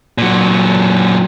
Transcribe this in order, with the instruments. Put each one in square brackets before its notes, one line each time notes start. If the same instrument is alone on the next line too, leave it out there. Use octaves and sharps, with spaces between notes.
[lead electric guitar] A#2 F#3